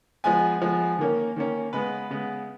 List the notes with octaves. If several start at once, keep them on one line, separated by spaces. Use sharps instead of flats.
F3 G#3 B3 G#5
F3 G#3 B3
D#3 A#3 C#4
D#3 A#3 C#4
C#3 G#3 B3 B4
C#3 G#3 B3